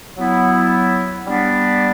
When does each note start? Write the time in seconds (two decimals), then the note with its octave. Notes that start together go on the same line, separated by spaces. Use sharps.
0.18 F#3 B3 E4
1.26 G3 B3 D4